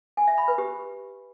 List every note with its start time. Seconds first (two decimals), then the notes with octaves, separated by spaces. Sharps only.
0.17 G#5
0.28 E5
0.38 B5
0.48 B4
0.58 G4